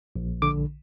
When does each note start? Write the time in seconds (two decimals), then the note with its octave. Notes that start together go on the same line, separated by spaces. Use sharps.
0.16 A#1
0.42 D3 D6